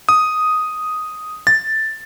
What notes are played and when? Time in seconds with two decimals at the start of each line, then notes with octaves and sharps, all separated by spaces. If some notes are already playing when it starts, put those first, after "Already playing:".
0.09 D#6
1.47 A6